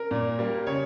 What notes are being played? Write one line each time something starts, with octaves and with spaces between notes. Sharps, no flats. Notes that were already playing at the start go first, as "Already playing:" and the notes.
Already playing: A#4
A#2
G3 A#3
C#3 C#5